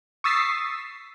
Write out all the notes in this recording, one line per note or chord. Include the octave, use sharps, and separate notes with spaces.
C#6 D#6 E6 A6 B6 C7